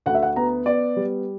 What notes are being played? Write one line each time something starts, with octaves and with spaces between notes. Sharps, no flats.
D2 F#5
E5
F#5
B3 A#5
B3 D5
G3